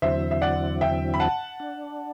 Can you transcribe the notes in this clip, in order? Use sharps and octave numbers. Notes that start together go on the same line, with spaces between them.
E2 D3 F#3 C4 E4 C5 E5
E5
D5 F#5
E5 G5
B5
F#5 A5
D4